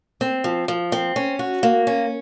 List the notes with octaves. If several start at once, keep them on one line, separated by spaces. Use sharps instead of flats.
C4
F3
F3
C4
C#4
F#4
A#3
C#4